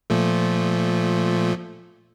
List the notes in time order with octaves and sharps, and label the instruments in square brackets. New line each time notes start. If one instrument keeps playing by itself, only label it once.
[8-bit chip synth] A#2 F3 A3